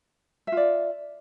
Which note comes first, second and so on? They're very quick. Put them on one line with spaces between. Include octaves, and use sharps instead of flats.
E5 F4 D5